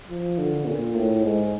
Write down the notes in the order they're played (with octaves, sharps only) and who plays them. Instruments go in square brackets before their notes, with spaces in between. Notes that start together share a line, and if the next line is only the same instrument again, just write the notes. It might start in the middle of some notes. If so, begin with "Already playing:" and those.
[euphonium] F3
D3
A#2
A2
G#2